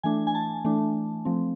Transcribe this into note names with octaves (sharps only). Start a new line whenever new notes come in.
E3 A3 D4 G#5
G#5
A5
E3 A3 D4
F3 A3 C4